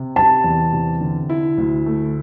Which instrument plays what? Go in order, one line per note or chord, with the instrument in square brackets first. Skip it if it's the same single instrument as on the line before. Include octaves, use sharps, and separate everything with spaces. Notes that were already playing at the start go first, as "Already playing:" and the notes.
Already playing: [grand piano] C3
[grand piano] G3 [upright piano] A5
[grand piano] E2
C3
D3
E4
D2
A3